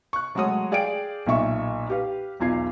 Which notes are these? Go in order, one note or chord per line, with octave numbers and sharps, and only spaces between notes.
C#6 F#6
F#3 G#3 A3 F#4 C#5 D#6
G#4 D5 F5 G5 D7
B1 A#2 E5 C#6
G4 B4 F5
B1 E2 F4 G#6 C7